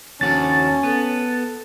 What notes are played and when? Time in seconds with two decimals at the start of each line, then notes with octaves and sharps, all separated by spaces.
0.21 D#2 C#4 F#4 A5 A6
0.83 B3 A4